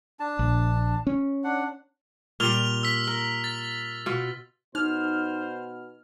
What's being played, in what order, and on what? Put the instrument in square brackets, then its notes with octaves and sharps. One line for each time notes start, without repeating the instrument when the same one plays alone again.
[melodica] D4 A5
[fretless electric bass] A#1
C#4
[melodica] D4 F#5
[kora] A#2 G3 [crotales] F6 F7 G7
[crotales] E6 B6
[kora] A#4
[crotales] A6
[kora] B2 F4
[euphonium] B2 [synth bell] D#4 [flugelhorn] C5 [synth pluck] F6